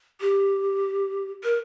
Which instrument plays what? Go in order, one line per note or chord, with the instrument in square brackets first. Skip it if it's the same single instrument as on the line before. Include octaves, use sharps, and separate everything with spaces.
[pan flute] G4
A#4